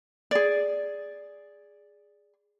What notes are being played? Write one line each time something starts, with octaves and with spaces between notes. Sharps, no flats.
G#4 D5